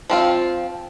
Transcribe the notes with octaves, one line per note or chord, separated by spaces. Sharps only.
F3 C4 F4